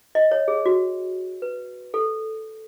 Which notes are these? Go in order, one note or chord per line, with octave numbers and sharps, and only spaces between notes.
D#5
C#5
G#4
F#4
B4
A4